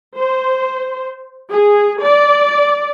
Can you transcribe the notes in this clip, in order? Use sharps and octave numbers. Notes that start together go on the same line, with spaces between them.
C5
G#4
D5